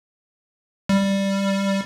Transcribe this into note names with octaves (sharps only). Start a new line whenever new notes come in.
G3